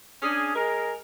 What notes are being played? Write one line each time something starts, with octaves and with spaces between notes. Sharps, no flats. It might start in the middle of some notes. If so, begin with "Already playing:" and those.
C#4 D4 G#4
G#3 G#4 A#4